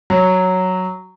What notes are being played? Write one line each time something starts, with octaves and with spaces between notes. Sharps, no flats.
F#3